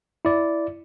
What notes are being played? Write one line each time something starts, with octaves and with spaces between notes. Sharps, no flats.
E4 D5